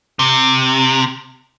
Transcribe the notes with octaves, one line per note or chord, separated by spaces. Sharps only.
C3